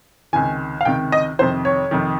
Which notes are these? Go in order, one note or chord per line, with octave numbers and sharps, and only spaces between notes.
C#2 C3 D#3 G#5
F5
C#2 C3 D#3 G5
D#5
F2 C3 D#3 C5
C#5
F2 C3 D#3